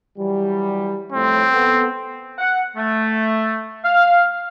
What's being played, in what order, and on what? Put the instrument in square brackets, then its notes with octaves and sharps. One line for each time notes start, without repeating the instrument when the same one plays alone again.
[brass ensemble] E3 F#3 G3
[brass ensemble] F2 A2 [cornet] C4
[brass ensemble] B3 A4
[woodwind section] F#5
A3
F5